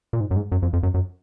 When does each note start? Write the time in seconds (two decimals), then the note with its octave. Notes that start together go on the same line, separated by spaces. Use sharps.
0.13 A#2
0.20 G#2
0.31 F#2
0.36 G#2
0.52 F#2
0.62 F2
0.73 F2
0.83 F#2
0.94 F#2